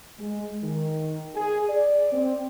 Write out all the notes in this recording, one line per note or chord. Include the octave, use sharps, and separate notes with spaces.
G#3
D#3
G#4
D5
C4